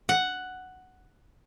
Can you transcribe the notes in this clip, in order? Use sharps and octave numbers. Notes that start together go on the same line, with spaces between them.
F#5